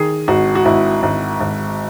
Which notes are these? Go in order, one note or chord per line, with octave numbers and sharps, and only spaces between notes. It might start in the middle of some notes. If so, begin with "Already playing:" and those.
Already playing: D#3 G#4
G#1 F#4
F#4
G#1 E4
G#1
G#1